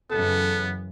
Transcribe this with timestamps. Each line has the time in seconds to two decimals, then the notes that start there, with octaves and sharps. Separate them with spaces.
0.11 F#2 C#3 E3 B3 A4